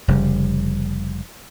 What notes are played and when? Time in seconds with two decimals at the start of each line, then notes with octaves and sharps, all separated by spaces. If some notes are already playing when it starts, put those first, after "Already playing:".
0.08 F1 C#3 G3